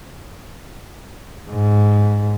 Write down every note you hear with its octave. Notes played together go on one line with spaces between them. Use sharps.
G#2